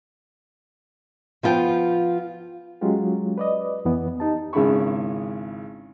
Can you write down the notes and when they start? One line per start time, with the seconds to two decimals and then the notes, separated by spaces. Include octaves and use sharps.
1.43 F3 B3 F4 G5
2.81 F#3 G#3 C#4 F4 G4
3.38 B4 D5 D#5
3.85 F2 E3 B3
4.20 D#4 G4 A5
4.53 G#1 C#3 G#3 E4 B5 C#6